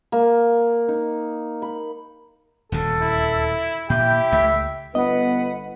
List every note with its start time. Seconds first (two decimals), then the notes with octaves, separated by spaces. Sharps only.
0.12 A#3
0.88 D#4
1.62 B5
2.72 D#1 D2 C#3 A4
3.01 E4
3.90 A#2 E4 G4 G5
4.32 C#2 A3 E5
4.95 G1 B3 B4 D#5 F#5